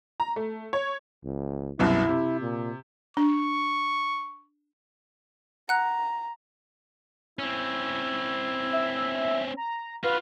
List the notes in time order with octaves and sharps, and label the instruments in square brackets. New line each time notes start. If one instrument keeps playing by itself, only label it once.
[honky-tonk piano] A#5
A3
C#5
[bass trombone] C#2
[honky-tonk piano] C2 F#2 B2 [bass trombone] E4
[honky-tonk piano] C3
[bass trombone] A#2
[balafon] D4 [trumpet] C#6
[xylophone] F#5 F#6 [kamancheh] A#5
[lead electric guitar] C4 C#4 [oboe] E4
[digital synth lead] E5
A#5
[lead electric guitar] F4 F#4 [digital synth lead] B4 [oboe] F5